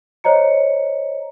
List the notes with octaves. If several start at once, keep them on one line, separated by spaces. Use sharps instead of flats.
C5 C#5 D#5 A#5 C#7